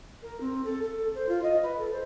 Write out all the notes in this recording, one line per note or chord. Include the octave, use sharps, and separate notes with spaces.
A#4
C4
A4
A4
C5
F4
D#5
B4
A4
C5